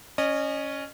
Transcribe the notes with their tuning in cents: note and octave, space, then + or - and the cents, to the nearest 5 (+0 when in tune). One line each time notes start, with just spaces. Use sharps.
C#4 +0 D#5 -35